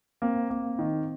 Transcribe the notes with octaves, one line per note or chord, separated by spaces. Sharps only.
A#3 C4
A#3
D#3